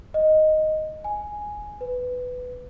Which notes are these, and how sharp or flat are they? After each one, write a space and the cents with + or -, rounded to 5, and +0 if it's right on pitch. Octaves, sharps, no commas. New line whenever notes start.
D#5 +0
G#5 +0
B4 +15